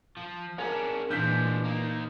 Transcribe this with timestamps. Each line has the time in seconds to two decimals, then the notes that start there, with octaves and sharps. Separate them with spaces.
0.17 F3
0.58 C#4 D4 G#4 A#4 F5
1.11 A#2 E3 F3 G#3 D4 G6 B6
1.64 D#3 A#3